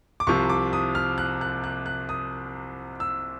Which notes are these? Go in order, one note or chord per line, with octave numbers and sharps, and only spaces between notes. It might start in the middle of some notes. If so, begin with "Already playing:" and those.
D6
C2 C3 F3 C#6
D6
D#6
F6
F#6
F#6
F#6
F#6
D#6
E6